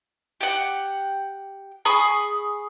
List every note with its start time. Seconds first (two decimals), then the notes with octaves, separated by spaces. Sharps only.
0.41 G4 F#5
1.85 G#4 B5 C#6 D#6